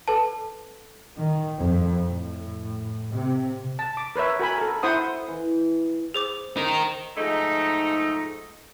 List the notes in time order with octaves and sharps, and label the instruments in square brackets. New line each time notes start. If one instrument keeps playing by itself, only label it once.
[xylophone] A4 B4 A5
[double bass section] D#3
F2
A2
C3
[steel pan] A5
D6
A#4 B4 C#5 E5
F#4 A#4 G#5 B5
A4 A#4
E4 C5 F#5 D#6
[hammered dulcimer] E3
[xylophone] G#4 C5 D6
[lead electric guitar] D#4 A#4 [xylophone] C5
[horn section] G#2 F3 A3 D#4